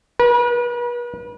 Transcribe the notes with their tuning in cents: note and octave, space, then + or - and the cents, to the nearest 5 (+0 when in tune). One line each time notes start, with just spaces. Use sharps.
B4 -40